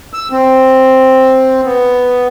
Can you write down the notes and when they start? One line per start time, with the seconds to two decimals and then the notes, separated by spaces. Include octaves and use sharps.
0.14 E6
0.31 C4
1.65 B3